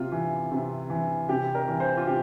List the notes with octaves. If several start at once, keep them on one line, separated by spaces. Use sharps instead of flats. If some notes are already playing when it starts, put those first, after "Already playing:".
Already playing: C3 F4
E3
C3
E3
C3 G4
A#4
E3
C5
F4
C3 G4